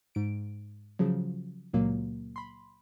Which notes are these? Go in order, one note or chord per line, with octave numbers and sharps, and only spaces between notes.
G#2 D7
C#3 F3 F#3
C#2 A#2 F#3 A#3
B5 C6